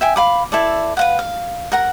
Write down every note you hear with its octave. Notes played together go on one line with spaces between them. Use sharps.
E5 G5 G#5
F5 B5 D6
E4 A4 D5
B4 F5 F#5
F5
A#4 F#5 A#5